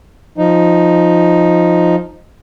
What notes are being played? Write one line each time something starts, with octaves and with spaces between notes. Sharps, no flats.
F3 D#4